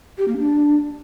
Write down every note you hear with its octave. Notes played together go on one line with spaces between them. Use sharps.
G4
A#3
D4